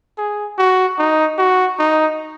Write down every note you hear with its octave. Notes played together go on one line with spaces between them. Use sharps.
G#4
F#4
D#4
F#4
D#4